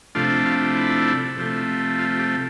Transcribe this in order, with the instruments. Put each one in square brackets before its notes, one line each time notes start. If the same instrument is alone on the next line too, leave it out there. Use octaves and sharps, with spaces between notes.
[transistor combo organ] C3 F3 A3 D4 F4
F4
E4
C3 F3 A3
F4
G4